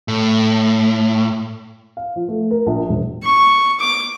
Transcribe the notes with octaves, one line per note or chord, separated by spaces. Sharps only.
A2
F5
F3
A3
A#4
A#1
E1
C#6
D6